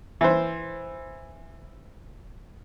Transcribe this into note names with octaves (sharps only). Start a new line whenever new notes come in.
E3 C5